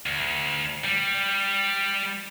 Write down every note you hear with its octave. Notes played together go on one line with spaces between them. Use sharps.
D2
G3